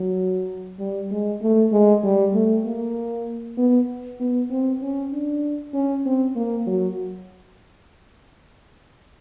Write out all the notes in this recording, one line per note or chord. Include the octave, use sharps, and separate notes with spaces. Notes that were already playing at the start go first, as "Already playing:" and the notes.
Already playing: F#3
G3
G#3
A3
G#3
G3
A3
A#3
B3
B3
C4
C#4
D4
C#4
C4
A#3
F#3